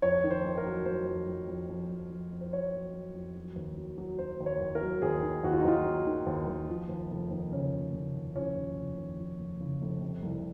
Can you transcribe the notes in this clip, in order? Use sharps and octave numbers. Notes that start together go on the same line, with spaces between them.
F2 C#5
D#3
C5
F2
A#4
F#3
F#3 C5
F2
F2
F2
F2
F2
F2
F2
C5
F2 C#5
F#3
F#3
F2
F#3
D#2
F#3
F#3
F#3 C5
D#2
C#5
D#2
A#4
F#3
D#2 G#4
D#3
D#2 F#4
F4
D#4
D#2 F4
F#3
D#3
D#2
D#2
F3
D#2
F1
D#2
C#3 C#4
F1
C#3
D#2
F3 C#4
D#2
F1
D#2
F3
F1
C#3
F1
C3
C2